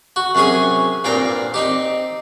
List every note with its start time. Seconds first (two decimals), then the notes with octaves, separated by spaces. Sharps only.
0.16 F#4
0.35 F#2 C3 C#4 G#4 G#5
1.04 G2 A#2 C4 G5 A#5
1.54 C4 D#4 G4